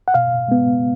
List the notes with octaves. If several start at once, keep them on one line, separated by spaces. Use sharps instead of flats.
F#5
B2 F5
G#3 B3